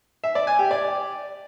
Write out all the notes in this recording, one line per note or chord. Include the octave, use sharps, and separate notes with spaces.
E5
D5
G#5
G4
D5